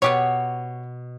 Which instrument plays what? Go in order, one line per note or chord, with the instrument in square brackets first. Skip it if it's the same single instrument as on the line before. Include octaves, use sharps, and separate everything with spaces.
[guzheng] B2 [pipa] B3 G4 C#5